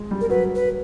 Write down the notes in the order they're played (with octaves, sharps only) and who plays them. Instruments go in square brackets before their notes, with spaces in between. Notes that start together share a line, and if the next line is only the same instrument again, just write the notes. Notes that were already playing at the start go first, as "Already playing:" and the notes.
Already playing: [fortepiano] G#3
G3
[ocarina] A#4
[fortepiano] F#3 [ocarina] B4
[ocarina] B4